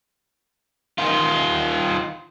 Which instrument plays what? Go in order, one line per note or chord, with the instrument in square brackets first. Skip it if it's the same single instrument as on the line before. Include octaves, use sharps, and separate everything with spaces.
[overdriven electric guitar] D#3 F4